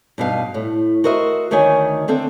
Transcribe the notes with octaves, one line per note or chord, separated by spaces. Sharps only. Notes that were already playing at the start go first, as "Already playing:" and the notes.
G2 B2 D#4 F5
A2
F#4 A#4 C5 D#5 E5
D2 D#3 C#5 D#5 G#5
D3 C4 A4 E5